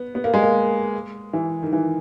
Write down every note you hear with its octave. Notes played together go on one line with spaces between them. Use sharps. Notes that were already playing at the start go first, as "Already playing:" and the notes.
Already playing: B3
B3
A#3
G#3
A#3
E3
D#3
E3